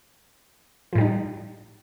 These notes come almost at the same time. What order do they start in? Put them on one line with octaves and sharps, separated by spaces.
F3 A2 G3 D#4